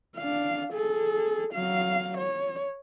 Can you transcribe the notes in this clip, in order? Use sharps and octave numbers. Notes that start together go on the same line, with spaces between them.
D4 F5
G#4 A4
F#3 F5
C#5